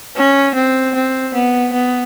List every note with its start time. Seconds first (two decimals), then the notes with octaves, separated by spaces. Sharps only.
0.16 C#4
0.55 C4
0.95 C4
1.34 B3
1.73 B3